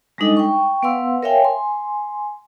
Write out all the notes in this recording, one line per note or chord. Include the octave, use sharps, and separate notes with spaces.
G3 G#3 D4 D#4 A4 D#5
G5 C#6
B3 B4 F5 F#5 C6 E6
A#4 C#5 E5 F5 G5 G#5
G#5 C6